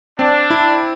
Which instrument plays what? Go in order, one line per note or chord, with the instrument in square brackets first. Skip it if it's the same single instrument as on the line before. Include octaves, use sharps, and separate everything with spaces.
[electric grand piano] C4 [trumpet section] D4
[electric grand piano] E4